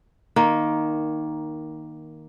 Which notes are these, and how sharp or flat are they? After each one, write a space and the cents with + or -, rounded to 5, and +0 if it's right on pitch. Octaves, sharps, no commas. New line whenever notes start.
D#3 +0 A#3 +10